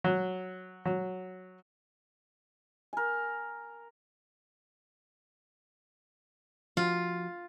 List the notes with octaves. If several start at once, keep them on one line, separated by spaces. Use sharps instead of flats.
F#3
F#3
A#4 G#5
F3 F4 F#4